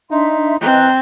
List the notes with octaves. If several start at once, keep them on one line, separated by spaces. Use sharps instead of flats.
D4 D#4 E5 C6
E3 C4 D#5 A#5 F#6